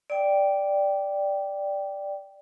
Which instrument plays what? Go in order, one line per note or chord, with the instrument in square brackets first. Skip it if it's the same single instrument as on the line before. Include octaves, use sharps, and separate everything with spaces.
[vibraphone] D5 G5